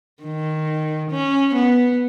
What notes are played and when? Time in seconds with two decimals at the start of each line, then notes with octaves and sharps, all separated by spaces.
0.23 D#3
1.11 C#4
1.55 B3